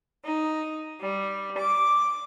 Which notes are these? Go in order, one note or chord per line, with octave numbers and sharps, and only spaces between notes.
D#4
G3
D6